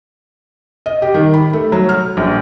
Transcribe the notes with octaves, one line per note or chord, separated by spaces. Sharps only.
D#5
G4
D#3
B5
A3
F#3
F6
A#1